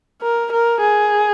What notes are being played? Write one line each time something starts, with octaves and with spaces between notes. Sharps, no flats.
A#4
A#4
G#4